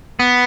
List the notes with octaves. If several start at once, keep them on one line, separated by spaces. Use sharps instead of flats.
B3